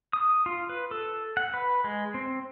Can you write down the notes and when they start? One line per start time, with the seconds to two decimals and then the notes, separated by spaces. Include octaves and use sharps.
0.13 D#6
0.46 F4
0.69 B4
0.91 A4
1.37 F#5
1.54 B4
1.84 G#3
2.14 C4